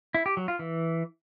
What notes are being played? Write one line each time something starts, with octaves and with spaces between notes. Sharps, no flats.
E4
G4
F#3
F4
E3